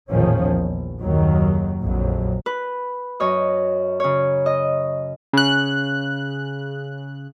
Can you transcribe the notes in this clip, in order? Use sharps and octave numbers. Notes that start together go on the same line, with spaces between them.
A1 E2 A#2 D#3 F3 C#4
A#1
F#1 D#2 D#3 F#3
A#1 F2 F#3
B4
F#2 C#5 D#5
C#3 C#5
D#5
C#3 F#6